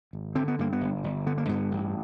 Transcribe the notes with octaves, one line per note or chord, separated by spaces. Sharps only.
G#1
D3 C4
B3
G2 A#3
B3
G1
G1
D3 B3
A#3
G2 B3
A1